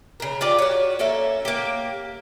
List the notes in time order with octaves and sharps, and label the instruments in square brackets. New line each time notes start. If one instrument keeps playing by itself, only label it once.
[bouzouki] C#3 A#4
F4 G4 D5
F#4 C#5
A#3 C#4 A4 E5
A#3 G4